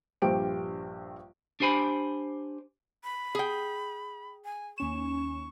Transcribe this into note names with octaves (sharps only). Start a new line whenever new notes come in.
A#1 G2 G4 C5 G5 D7
D4 G4 C5 G#5 B5
B5
G#4 G5
G#5
D#2 C#4 C#6 E7